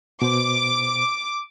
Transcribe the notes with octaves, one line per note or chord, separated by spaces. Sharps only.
B2 C5 D6